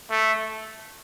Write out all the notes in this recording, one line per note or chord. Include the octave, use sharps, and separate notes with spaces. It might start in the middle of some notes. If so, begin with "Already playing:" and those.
A3